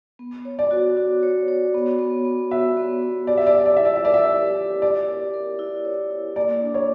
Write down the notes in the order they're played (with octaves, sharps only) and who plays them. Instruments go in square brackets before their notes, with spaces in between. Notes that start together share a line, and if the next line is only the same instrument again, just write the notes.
[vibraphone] B3
C#5
[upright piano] D5
[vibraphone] F#4
F#4
C#5
C#5
B3
B3
B3
[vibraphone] F#4 [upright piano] E5
[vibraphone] B3
C#5
[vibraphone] G4 [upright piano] D5
[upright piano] E5
D5
[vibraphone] C#5 [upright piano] E5
[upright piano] D5
[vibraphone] E4 [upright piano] E5
[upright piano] D5
E5
[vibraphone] A#4 [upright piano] D5
[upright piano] E5
D5
[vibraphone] E4
G4
[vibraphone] A#4 [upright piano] D5
[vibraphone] A#4
A#4
E4
C#5
E4
[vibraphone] A#3 [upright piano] D5
[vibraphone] D4
[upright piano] C#5